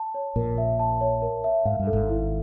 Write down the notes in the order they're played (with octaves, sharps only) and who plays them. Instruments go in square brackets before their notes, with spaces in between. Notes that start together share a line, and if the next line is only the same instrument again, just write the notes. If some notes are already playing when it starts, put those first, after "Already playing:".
Already playing: [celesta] A5
C#5
[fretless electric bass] A#1 A#2 [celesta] A#4
[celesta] E5
A5
C#5
A#4
E5
[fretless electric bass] G#2 [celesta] F5
[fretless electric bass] G2
[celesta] A4
[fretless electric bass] G#1 G#2
[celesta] E4